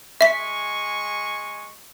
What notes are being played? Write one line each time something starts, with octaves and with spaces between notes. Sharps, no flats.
G#3 E5 G#5 C#6 B6